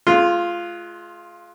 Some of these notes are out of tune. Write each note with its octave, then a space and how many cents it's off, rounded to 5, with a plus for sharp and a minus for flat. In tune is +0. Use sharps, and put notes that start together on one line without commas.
G#3 +30 F4 -5